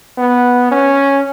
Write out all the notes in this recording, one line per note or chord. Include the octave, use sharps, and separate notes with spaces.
B3
C#4